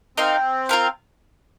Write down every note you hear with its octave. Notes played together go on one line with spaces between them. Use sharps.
C4 D#4 A#4 F5
F4 A#4 F5